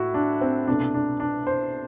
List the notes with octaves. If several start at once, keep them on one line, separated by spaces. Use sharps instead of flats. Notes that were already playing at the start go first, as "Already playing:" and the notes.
Already playing: A2 E4 F#4
D4
C4
C2 B2 A3 D4
D4
D4
C5